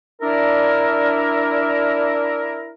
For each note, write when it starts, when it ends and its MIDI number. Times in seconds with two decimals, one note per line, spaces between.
0.22 2.73 62
0.22 2.73 64
0.22 2.73 70